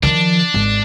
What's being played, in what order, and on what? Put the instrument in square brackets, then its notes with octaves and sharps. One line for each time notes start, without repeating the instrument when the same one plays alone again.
[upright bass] D#3 F3 [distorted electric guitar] D4
[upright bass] G#1